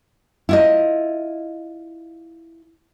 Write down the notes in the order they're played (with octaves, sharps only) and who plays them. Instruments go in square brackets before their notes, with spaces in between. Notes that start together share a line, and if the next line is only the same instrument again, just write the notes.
[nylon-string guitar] E4 F4 D#5